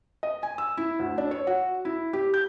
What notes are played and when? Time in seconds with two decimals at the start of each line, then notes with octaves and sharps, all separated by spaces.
0.23 D#5
0.43 G#5
0.58 E6
0.77 E4
0.99 D2
1.18 D4
1.31 C#5
1.47 F#4
1.85 E4
2.13 G4
2.34 G6